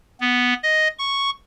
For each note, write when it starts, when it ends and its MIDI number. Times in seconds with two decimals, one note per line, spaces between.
0.21 0.54 59
0.63 0.88 75
0.99 1.30 85